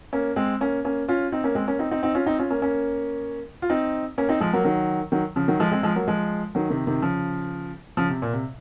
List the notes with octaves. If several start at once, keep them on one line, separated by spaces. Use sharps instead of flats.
A#3 C#4
G#3 C4
A#3 C#4
A#3 C#4
C#4 F4
C4 D#4
A#3 C#4
G#3 C4
A#3 C#4
C4 D#4
C4 D#4
C4 D#4
C#4 F4
C4 D#4
C#4 F4
A#3 C#4
A#3 C#4
F4
C4 D#4
A#3 C#4
C4 D#4
F3 G#3
F#3 A#3
D#3 F#3
D#3 F#3
C#3 F3
D#3 F#3
F3 G#3
G#3 C4
F3 G#3
F#3 A#3
F3 G#3
D#3 F#3
C3 D#3
C3 D#3
C#3 F3
C#3 F3
C3
A#2
C3